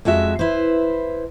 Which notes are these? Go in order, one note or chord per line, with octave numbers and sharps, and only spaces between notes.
F2 G#3 F#4 E5
E4 B4 C5